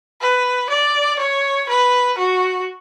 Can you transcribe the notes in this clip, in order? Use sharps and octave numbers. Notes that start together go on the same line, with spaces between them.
B4
D5
C#5
B4
F#4